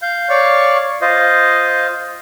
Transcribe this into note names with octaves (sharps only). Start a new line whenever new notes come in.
F5 G6
C#5 D5 F5 C#6
F4 C5 D#5 F5